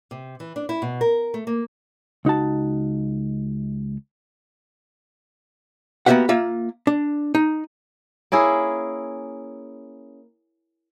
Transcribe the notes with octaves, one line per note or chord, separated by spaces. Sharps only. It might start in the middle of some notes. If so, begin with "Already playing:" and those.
C3
E3
D4
E4
B2
A#4
A3
A#3
C#2 D#4 F#4 A5
A#3 B3 F#4 G4 E5 F#5
A#3 F4 E5
D4
D#4
A#3 C#4 E4 G#4